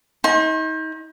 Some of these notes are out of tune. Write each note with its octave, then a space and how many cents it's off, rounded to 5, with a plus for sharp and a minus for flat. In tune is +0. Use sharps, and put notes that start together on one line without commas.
D#4 +35 C6 +45